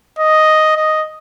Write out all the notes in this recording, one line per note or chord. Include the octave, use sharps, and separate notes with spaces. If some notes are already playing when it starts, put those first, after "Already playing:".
D#5
D#5